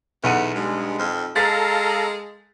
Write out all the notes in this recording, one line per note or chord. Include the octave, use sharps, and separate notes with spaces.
B1 E2 F#5 D#7
G2 G#3
F2
G#3 A4 F5 A#5 A6 B6